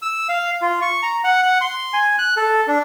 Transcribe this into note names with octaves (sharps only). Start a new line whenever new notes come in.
E6
F5
F4
C#6
A#5
F#5
F#5
C6
G#5
F#6
A4
D4